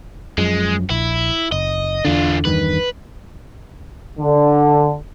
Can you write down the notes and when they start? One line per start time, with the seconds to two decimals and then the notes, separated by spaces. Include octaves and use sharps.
0.38 F#2 F3 G#3
0.90 A#1 E4
1.52 F#1 D#5
2.05 E2 D3 D4 F4
2.45 E2 G2 D#3 B4
4.19 D3